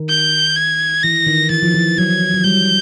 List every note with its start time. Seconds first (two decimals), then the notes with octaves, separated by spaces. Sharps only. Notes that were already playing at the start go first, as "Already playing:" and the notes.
Already playing: D#3
0.10 G6
0.56 G#6
1.03 E3 A#6
1.27 D#3
1.50 E3 A6
1.63 F3
1.74 E3
1.98 F#3 G#6
2.34 F#3
2.44 G3 G6